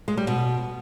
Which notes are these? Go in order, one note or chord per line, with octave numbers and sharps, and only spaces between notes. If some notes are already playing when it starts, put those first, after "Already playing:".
G#3
G3
B2